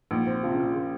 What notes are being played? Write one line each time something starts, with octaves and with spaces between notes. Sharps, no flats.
A#1 G#2
C4
C3 F3
A#2 C#3
C#3